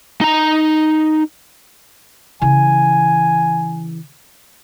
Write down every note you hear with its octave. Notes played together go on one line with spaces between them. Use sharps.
D#4 A#5
C#3 E3 G#5